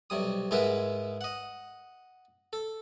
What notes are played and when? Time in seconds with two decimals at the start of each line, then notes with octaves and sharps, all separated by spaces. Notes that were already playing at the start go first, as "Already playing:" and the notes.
0.10 B1 C3 G3 D#6
0.51 G#2 G#3 B3 E4 A#4 B4
1.21 D#5 F#5
2.53 A4